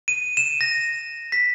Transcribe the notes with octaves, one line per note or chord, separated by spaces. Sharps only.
D#7
E7
A#6
B6